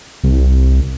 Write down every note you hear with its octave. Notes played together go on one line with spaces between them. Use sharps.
C2